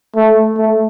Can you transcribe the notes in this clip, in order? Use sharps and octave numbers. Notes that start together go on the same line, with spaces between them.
A3
A3